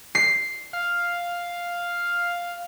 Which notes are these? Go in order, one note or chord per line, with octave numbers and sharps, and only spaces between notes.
C7
F5